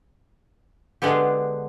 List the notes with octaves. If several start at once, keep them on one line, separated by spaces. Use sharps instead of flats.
D3 G#3 B3 G4